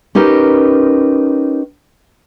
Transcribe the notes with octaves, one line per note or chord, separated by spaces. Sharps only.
C#4 D#4 G4 A#4 B4